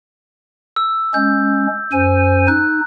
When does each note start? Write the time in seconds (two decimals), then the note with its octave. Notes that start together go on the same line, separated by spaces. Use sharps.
0.76 E6
1.14 G#3 C#4 G6
1.92 F#2 C5 G#5
2.48 D#4 F#6